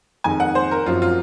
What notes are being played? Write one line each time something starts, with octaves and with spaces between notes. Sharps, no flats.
F2 D#3 G#3 D#4 G#5
F#5
C5
A#4
F#2 F3 C4 F4 F#4
F4